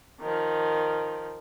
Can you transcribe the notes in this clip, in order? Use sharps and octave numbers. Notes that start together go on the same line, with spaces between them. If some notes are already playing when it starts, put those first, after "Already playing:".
D#3 F3